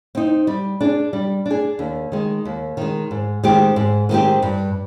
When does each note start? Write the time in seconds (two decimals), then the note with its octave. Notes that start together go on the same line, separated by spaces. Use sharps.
0.15 C4 D#4
0.47 G3
0.81 D4 G#4
1.13 G3
1.46 D4 G#4
1.79 D#2
2.12 D#3 G#3
2.45 D#2
2.77 D#3 G#3
3.11 G#2
3.43 D#3 G#3 C4 G4
3.76 G#2
4.09 D#3 G#3 C4 G4
4.42 G2